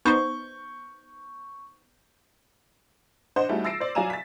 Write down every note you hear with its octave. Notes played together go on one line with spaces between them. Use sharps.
B3 D#4 C5 C#6 G6
D4 C5 D#5 F#5
G3 A3 D#4 E4 F#4 G#4
E6 A6 A#6 C7 D7 E7
C5 D5
F#3 D5 F5 G#5 A#5 E7
A6 B6